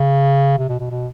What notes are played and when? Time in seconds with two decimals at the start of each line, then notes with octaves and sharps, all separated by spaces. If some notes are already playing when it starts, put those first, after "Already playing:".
Already playing: C#3
0.58 C3
0.69 B2
0.79 B2
0.90 B2